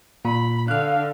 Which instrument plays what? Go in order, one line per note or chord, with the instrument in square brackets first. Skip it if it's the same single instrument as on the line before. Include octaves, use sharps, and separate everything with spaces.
[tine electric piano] A#2 [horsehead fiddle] B5
[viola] D3 [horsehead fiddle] F5 [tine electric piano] F6 F#6